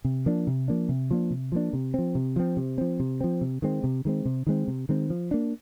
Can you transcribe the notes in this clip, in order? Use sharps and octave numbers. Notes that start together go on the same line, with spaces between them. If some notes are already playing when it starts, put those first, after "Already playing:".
C3
F3 A#3 D4
C3
F3 A#3 D4
C3
F3 A#3 D4
C3
F3 A#3 D4
C3
F3 C4
C3
F3 C4
C3
F3 C4
C3
F3 C4
C3
D#3 G#3 C4
C3
D#3 G#3 C4
C3
D#3 G#3 C4
C3
D#3 G#3 C4
F3
A#3 D4